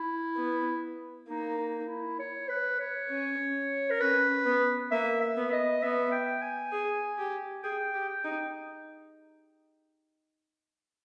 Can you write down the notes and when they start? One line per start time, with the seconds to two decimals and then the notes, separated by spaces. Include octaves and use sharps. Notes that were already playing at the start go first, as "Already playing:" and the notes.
Already playing: E4
0.37 B3
1.28 A#3 D#4
1.58 D#4
1.88 E4
2.19 C#5
2.49 B4
2.80 C#5
3.09 C#4
3.90 A#4
4.01 C#4 B4
4.46 B3
4.92 A#3 E5
5.21 E5
5.37 B3
5.52 D#5
5.82 B3 E5
6.12 G5
6.42 G#5
6.72 G#4
7.18 G4
7.63 G#4 G5
7.94 G4
8.09 G5
8.24 D#4